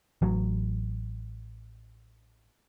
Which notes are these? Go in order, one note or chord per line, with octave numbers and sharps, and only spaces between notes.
A1 F#3